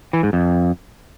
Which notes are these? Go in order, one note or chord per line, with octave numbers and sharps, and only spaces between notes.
E3
G#2
F2